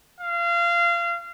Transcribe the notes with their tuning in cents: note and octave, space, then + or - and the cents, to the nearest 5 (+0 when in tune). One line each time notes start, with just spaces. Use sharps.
F5 -25